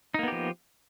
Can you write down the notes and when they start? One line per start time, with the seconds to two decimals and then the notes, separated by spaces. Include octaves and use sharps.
0.14 D#4
0.19 A#3
0.23 B3
0.28 G4
0.32 F3